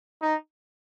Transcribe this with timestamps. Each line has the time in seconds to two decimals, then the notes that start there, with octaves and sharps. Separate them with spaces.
0.22 D#4